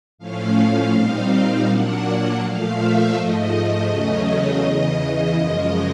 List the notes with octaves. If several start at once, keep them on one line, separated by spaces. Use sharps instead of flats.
A2 F3 A3 C#4 F5
A#2 G3 C4 D#4
A#2 F#3 A#3 D4 F#5
A#2 F3 A3 F5
E5
G#2 F3 A3 D#5
E2 C#3 F#3 A3 C#4
E2 C#3 E3
F#2 C#3 F3 G#3